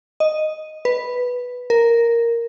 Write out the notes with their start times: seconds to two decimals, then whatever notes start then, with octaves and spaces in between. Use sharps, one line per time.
0.20 D#5
0.85 B4
1.70 A#4